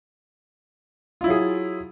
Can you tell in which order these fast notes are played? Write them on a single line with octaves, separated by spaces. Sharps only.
F4 E4 F#3 G#4